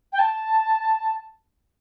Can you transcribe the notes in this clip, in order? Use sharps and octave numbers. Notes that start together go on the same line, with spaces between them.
G5
A5